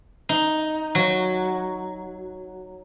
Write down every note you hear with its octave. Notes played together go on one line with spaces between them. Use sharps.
D#4
F#3